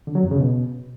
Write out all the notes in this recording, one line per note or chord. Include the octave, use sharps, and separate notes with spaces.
D3
F#3
F2
C#3
B2